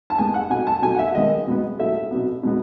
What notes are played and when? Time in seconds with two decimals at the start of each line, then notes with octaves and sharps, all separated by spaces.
0.10 A5
0.18 A2 G#3 B3 G#5
0.34 F#5
0.50 B2 A3 G#5
0.67 A5
0.82 B2 F#3 A3 G#5
0.95 F#5
0.99 E5
1.15 D#3 G#3 B3 D#5
1.47 B2 G#3 B3
1.79 A2 F#3 A3 E5
2.11 B2 F#3 B3
2.43 B2 G#3 B3